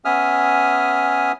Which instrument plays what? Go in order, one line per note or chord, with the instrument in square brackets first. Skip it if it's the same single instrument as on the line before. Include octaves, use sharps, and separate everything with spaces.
[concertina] B3 C#4 E5 G#5 D#6 F6